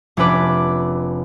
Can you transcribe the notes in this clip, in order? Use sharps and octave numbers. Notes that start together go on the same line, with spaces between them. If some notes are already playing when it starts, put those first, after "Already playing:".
F1 C#4 D4 B4 D6